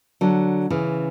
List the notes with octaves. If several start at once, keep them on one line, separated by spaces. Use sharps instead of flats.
D3 F#3
C#3 E3